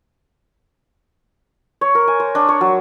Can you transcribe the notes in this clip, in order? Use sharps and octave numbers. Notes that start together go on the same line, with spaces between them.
C#5
A#4
G#5
C5
D4
C#5
F#3